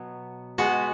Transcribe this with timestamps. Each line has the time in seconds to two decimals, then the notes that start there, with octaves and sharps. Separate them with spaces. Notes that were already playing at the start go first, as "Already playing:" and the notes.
Already playing: B2 F#3 B3
0.58 B2 G#3 B3 F#4